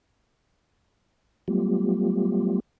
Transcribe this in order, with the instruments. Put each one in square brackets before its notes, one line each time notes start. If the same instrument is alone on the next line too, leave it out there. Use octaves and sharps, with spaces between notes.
[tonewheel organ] F#3 G3 A3 B3 F4 G4